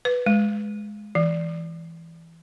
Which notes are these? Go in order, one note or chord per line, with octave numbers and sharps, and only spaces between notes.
B4
G#3
E3